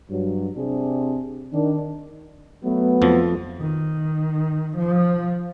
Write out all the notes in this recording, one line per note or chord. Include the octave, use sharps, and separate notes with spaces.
G2 F#3
C3 C4 D4 G#4
D#3 D4
F#3 A3 B3
F2 F3
D#3
F3